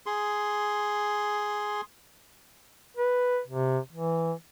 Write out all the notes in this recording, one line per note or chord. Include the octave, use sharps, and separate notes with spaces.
G#4 C6
B4
C3
E3